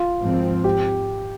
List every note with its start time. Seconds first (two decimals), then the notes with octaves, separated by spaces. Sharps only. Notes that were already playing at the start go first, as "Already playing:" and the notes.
Already playing: F4
0.22 G#1 G#2 F3 C4
0.64 G4